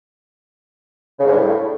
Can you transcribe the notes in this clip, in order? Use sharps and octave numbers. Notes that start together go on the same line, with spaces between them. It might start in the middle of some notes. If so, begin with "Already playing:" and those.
C#3
G#2
G2
A2